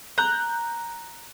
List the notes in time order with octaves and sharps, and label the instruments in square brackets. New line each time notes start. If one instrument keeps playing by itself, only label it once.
[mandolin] A#5 [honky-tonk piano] F#6 G6